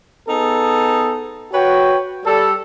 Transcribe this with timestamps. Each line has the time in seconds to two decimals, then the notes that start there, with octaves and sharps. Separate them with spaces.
0.28 B3 D#4 G#4 A4
1.53 F#4 B4 C#5 G5
2.26 G3 A4